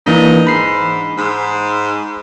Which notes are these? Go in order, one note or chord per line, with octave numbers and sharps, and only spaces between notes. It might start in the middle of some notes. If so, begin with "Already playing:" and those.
E3 A#3 D4 D#4
G#2 B5 C7
G#2